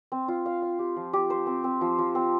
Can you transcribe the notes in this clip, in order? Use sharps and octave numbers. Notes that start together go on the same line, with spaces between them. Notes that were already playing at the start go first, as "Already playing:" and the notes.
C4
F4
F5
F5
G4
F3
G4
C5
C4
C4
F3
F3
C4